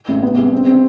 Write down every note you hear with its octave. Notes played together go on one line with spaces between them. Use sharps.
A1
B3
C2
C4
C4